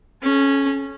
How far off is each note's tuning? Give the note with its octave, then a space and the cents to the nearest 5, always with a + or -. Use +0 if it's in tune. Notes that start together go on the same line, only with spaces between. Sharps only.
C#4 -10 A4 -45